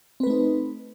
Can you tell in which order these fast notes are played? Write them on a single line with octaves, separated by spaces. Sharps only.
C4 B4 A3 D#4